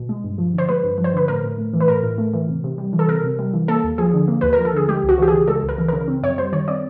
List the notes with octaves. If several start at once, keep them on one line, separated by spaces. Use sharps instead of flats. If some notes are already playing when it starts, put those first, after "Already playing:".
Already playing: B2
G#3
G2
F3
D3 C5
G#3 B4
G2
F3
C5
D3 B4
A2 A#4
A2
A3
E3
B4
A2 A#4
A2
A3
E3
C3
C3
G3
E3
A4
C3 A#4
C3
G3
E3
A#3 A4
D#2
F3 G#4
D3
A#3
D#2 B4
A#4
F3
A4
D3 G#4
G#3 G4
C#2
F#4
E3 G4
C#3 G#4
G#3 A4
C#2
A#4
E3
C#3 A#4
C4
F#2 C#5
G3 C5
D#3 C#5
C4 D5